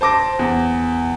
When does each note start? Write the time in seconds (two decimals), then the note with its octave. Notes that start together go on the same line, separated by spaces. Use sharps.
0.01 C5 A5 D6 A#6
0.39 E2